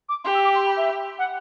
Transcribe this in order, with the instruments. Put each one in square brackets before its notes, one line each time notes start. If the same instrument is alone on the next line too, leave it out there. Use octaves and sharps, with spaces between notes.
[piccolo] D6
[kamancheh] G4 [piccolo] C6
[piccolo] E6
D6
C6
B5
E5
F#5